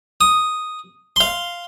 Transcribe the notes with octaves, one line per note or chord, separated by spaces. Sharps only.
D#6
F5 C6